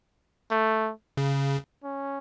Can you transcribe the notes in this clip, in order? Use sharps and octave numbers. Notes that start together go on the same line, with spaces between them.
A3
C#3
C#4